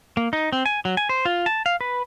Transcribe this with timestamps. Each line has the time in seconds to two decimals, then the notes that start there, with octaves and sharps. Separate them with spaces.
0.17 A#3
0.33 D#4
0.53 C4
0.66 G#5
0.85 F#3
0.97 G#5
1.09 C5
1.25 F4
1.46 A5
1.66 F5
1.81 B4